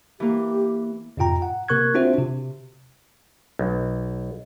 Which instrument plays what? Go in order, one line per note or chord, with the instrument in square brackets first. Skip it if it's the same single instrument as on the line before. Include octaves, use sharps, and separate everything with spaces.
[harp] E3 A#3 [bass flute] G4
[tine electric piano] F2 G#2 C3 F4 G5 A#5
F#5
C3 A#3 A#4 C#6 F#6 G#6
C4 D4 F4 F#4 C5 E5
C3
[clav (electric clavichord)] B1